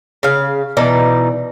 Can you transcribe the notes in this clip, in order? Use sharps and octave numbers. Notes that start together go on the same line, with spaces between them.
C#3 F5
B2 E3 D#4 D5